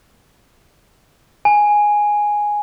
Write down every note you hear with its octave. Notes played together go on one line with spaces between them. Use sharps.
G#5